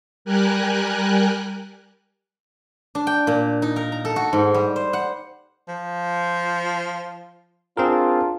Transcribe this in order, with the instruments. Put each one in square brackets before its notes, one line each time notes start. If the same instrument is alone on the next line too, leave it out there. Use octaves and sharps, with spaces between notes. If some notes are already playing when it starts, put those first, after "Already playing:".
[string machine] G3 G4 A#4 G#5 F#6
[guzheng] D4
G5
A#2
D#4
A#4
A#5
A4
F#4
G#2
G3
C5
F#5
[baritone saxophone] F3
[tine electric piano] C4 G#4 A#4 [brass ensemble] D4 F4